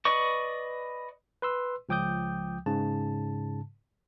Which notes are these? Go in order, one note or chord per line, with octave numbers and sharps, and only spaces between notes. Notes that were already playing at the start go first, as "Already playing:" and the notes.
B4 D5 D#5 C#6
B4 C6 E6
C#2 F3 G5 D6 D#6 G6
G#2 C#3 A5